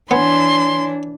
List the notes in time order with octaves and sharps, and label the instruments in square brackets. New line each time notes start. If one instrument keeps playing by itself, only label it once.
[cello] E3 D4 [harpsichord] B3 [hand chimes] C#5 G#5 G#6 [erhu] C6